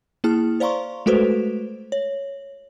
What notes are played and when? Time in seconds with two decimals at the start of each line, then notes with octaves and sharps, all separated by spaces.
0.24 A#3 E4 G#4 A5 F6
0.60 C5 D5 F5 A#5 C6 C#6
1.06 G#3 A3 F#4 A4 B4 C5
1.92 C#5